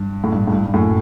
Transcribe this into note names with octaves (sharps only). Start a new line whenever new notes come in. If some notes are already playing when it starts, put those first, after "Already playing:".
Already playing: G2
A2
G2
A2
G2
G2
F#2 A2